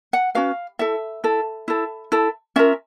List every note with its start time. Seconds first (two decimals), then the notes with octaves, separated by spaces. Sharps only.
0.13 F#5
0.35 C#4 F#4 B4 F5
0.79 E4 A4 E5
1.24 E4 A4
1.68 E4 A4
2.12 E4 A4
2.56 C#4 F4 A#4 E5